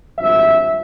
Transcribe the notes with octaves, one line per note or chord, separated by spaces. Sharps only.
G#1 G2 F3 E5